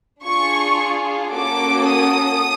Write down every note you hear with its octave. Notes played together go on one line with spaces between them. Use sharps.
D4 F4 G#4 C#6
A#3 C#4 F#4 A4 D6
D#6